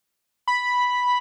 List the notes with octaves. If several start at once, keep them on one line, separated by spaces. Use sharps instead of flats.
B5